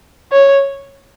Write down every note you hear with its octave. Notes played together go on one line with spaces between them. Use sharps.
C#5